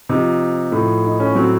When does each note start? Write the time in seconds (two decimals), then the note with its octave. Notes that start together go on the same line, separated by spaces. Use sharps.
0.09 C3 F3 D#4
0.72 A2 F3
1.04 D#4
1.20 C#4
1.35 A2 F#3 C4